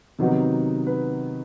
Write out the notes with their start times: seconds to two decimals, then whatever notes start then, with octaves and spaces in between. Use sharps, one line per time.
0.19 C3 D#3 F#3 B3 D#4
0.87 B4